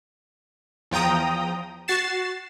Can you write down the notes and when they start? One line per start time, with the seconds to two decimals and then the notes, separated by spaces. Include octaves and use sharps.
0.91 E2 F3 G5 A#5 D#6
1.88 F#4 A6 C7 E7